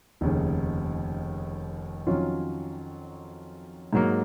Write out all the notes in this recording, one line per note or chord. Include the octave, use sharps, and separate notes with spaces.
F1 D#2 C#3
F2 D#3 F#3 C#4 F4
G#2 F#3 A#3